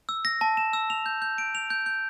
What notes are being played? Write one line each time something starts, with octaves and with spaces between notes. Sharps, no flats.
E6
A#6
A5
E7
E6
F7
G6
G6
D7
F7
G6
G6